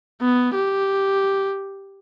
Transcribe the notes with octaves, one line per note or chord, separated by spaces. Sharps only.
B3
G4